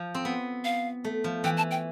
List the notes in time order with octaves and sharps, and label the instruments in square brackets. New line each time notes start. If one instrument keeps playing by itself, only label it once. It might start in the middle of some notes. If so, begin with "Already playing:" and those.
Already playing: [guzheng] F3
C4
B3
[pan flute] F5
[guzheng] A3
F3
[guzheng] E3 [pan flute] G5
[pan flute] A5
G5